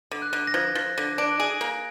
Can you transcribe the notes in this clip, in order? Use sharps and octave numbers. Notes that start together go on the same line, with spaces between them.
D3
F#6
D3
A#6
F3 G#6
F3
D3
D4 D7
G#4
A#3